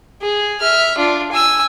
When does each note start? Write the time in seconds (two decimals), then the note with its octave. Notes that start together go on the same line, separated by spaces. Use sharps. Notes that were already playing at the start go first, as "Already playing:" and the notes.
0.22 G#4
0.60 E5 F6
0.98 D4 F4
1.32 G#5 E6